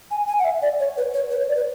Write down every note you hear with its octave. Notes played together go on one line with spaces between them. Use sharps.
G#5
G#5
F#5
E5
D5
C#5
B4
C#5
B4
C#5
D5
B4